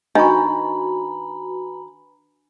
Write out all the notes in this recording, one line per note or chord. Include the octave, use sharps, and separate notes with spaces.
D#3 D4 F#4 B4 G#5 A#5 B5 C#6